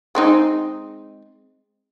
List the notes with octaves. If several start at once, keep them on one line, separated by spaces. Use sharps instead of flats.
G#3 C4 D#4